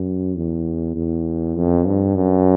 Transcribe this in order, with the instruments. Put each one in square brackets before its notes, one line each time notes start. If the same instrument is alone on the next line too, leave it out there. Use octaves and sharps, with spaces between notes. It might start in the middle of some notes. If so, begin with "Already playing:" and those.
Already playing: [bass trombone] F#2
E2
E2
F2
G2
F#2